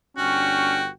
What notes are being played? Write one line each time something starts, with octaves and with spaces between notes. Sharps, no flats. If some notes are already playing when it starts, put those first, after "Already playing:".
G1 C#4 D4 F#4 G5